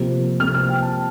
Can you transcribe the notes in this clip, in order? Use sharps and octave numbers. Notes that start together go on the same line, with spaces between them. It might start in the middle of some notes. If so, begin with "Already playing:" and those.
Already playing: C3 F3 A#3
C3 F3 A#3 F6
F6
G5
A5